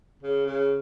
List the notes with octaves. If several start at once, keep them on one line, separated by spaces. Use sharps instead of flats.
C#3
C#3